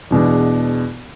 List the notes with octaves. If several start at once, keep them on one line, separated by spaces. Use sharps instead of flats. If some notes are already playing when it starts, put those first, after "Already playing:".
E2 B2 G#3 D4